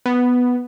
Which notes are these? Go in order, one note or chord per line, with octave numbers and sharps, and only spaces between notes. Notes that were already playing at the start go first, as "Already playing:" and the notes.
B3